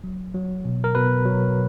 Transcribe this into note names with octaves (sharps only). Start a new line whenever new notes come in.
F#3
F#3
B2
A#4
B2 B4
F#3